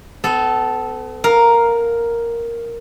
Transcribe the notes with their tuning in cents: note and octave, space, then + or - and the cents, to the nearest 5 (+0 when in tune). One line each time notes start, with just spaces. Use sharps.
B3 +40 A4 -10
A#4 +0 F5 +10